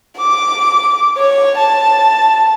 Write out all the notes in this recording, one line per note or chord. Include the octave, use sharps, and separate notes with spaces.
D6
C#5
A5